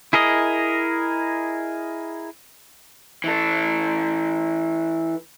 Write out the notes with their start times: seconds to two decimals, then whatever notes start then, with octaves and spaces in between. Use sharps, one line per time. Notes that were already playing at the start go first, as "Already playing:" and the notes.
0.13 E4 G#4 A#4 D#5
3.24 E3 A4